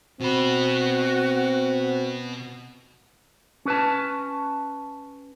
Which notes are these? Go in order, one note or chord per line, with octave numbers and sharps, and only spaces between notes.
B2 C4 F#4 B5
C#4 B4 A5